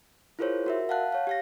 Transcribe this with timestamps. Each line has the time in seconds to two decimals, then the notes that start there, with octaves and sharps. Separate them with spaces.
0.39 E4 F4 G#4 A#4 C5 C#5
0.66 F#4 A#4 E5
0.89 F5 F#5 A5 F#6
1.12 C#5 F5
1.27 G4 F5 A#6